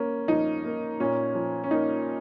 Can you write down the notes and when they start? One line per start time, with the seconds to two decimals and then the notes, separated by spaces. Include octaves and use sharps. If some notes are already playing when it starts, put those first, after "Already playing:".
Already playing: A#3 C#4
0.28 F3 D#4
0.64 A#3
1.00 A#2 C#4
1.35 F3
1.64 C#4
1.71 A#3 D#4